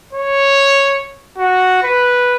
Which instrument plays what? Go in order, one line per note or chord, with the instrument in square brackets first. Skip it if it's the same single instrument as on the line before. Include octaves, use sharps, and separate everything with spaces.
[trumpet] C#5
F#4
B4